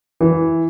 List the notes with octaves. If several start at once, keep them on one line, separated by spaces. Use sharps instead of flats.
E3